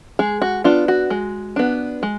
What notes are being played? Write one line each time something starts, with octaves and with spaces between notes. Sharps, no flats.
G#3 G#4
F#4
B3 D4 F4
F#4
G#3
B3 D4
G#3